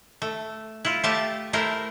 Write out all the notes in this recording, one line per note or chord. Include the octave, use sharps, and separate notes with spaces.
A3
E4 F4
A3 F4 G4 E5 A5
A3 E4 A#4 C5